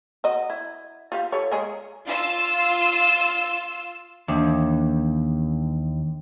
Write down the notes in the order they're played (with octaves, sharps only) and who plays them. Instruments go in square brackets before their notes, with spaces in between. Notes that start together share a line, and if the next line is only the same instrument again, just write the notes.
[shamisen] F#4 D#5
E4
F4 G4 F5
G4 A4 C#5
G#3 G#4 C#5
[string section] F4 E6
[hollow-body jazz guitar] D#2 [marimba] E3 D4